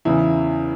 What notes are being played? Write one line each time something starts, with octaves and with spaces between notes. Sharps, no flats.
E2 C#3 E3 E4